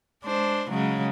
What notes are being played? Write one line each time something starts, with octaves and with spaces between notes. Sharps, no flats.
G#3 D4 C5
C#3 F#3 G#3